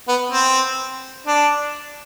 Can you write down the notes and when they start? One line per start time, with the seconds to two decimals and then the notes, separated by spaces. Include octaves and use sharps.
0.08 B3
0.32 C4
1.27 D4